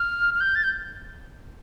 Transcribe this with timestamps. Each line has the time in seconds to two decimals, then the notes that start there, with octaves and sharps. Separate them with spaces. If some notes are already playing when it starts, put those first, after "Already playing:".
Already playing: F6
0.34 F6
0.41 G6
0.55 A6
0.64 G6